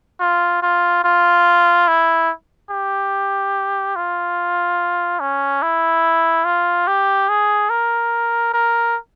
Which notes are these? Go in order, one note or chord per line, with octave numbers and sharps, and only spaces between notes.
F4
F4
F4
E4
G4
F4
C#4
E4
F4
G4
G#4
A#4
A#4